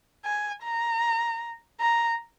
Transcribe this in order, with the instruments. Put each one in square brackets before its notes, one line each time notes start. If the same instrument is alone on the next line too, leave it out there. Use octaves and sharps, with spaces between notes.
[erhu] G#5
A#5
A#5